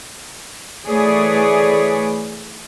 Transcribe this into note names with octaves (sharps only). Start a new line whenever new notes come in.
E3 A3 G#4 B4 C#5 D5